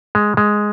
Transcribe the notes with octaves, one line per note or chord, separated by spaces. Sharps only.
G#3
G#3